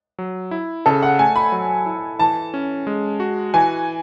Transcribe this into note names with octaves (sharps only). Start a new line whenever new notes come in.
F#3
E4
C#3 A4
F#5
A3 G#5
B5
F#3
E4
E3 A5
C#4
G#3
F#4
E3 G#5